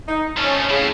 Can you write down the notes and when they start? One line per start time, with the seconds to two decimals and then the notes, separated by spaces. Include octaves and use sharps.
0.08 D#4
0.37 F3 A3 C#4
0.69 A2 C#3 E4